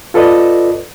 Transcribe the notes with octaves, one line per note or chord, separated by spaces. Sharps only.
F4 A4 B4 D5 D#5